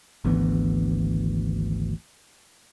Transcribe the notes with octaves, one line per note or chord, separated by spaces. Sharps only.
G#1 D2 E3 B3